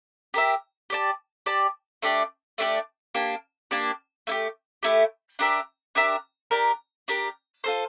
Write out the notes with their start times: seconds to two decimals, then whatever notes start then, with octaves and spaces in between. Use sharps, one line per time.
0.34 G4 A#4 E5
0.90 G4 D5 A5
1.46 G4 D5 A5
2.02 A3 D4 G4 D5
2.58 A3 D4 G4 D5
3.15 A#3 D4 G4
3.71 A#3 D4 G4
4.27 A3 E4
4.31 G4
4.83 A3 E4 G4
5.39 D4 G4 A#4 E5
5.95 D4 G4 A#4 E5
6.51 D4 G4 A#4
7.08 D4 G4 A#4
7.64 F4 A4 C5